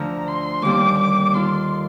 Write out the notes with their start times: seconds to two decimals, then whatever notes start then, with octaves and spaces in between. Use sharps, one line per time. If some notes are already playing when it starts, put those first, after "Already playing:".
Already playing: D2 D3 F3 A#5
0.27 C6
0.62 D#2 D3 G3 A#3 D6
0.98 D6
1.33 D#3 A#3 F4 A4 C6